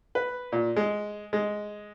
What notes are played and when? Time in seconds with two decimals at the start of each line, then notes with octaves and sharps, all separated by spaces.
0.15 B4
0.52 A#2
0.76 G#3
1.33 G#3